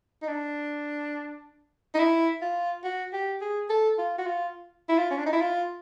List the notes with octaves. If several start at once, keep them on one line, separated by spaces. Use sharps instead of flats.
D#4
D4
D#4
E4
F4
F#4
G4
G#4
A4
F4
F#4
F4
E4
F4
C#4
D4
D#4
E4
F4